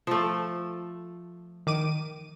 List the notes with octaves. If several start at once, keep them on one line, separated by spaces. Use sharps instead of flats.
F3 A3
D#3 D6 D#7